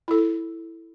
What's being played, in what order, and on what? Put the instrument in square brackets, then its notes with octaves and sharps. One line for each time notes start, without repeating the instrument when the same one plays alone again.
[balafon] E4 A4